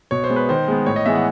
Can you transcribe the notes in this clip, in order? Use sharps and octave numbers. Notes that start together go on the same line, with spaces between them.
B2 C#5
C5
G#3 B3
B4
D#3 C5
G#3 B3
A2 C#5
D#5
E3 G#3 B3 E5
F#5